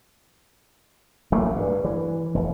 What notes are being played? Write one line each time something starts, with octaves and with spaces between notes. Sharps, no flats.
A1 F#3 A3 A#3
G2
E3
F1